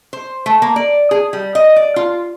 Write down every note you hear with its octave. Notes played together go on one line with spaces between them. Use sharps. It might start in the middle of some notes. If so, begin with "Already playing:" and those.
C5
A3
A#3
D5
G#4
G3
D#5
D5
F4